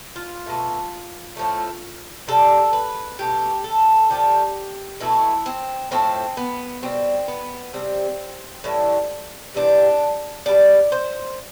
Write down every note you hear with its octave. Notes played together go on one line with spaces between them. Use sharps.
F4
B2 A3
A2 F3 A3
C3 G3 A4
B4
B2 A3 G4
A4
D3 F3 A3 G4
B2 A3 E4
C4
A2 F3 A3 C4
B3
B2 G3 C4
B3
C3 G3 C4
A2 E3 G3
C3 E3 G3 D4
B2 G3 D5
C5